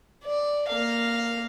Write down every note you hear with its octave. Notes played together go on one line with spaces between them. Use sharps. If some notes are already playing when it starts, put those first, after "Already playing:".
D5
A#3 F5